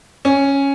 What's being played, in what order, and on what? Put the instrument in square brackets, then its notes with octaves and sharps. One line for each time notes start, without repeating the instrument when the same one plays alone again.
[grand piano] C#4